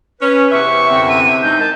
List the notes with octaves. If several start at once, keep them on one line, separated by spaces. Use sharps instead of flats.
C#4 B4
E2 C3 E5 C#6
F#2 D3 C4
D#7
G#3 D4 D#4 G6
A#4 D#5 A5